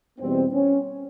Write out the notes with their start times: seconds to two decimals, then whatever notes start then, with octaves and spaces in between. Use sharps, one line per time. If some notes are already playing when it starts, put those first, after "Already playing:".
0.19 E2 B2 G3 B3 C4
0.54 C#4